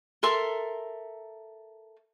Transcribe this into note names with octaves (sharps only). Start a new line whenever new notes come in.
A4 A#4 E5 C6